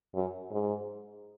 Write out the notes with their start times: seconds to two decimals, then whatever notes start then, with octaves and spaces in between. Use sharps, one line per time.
0.14 F#2
0.51 G#2